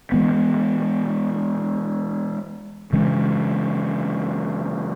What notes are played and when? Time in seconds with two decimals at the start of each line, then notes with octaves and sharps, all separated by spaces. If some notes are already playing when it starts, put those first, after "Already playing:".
0.12 E3 G#3 B3
2.93 C#3 E3 G#3 C#4